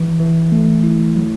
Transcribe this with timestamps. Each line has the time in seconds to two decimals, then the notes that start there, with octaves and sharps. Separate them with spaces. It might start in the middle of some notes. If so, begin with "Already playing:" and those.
Already playing: E3
0.20 E3
0.52 A3
0.83 E4
1.15 F#3